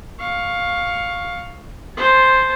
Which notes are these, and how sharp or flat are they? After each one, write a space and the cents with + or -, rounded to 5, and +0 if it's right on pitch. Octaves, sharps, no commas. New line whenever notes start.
F5 +10 C#6 +0
C5 +0 A5 -25